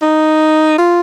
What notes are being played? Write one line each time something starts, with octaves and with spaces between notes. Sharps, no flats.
D#4
F4